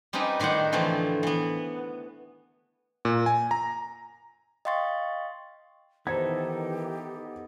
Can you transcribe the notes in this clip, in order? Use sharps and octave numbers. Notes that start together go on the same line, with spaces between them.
G3 C4 C#4 D#4 B4
A2 D#3 G3 C5 F#5
D3 E3 F3 A3 C4
E3 B3
A#2
G#5
A#5
D#5 F5 G5 C6 C#6 A6
D#3 E3 B3 D#4 G4 A4 C5 G#6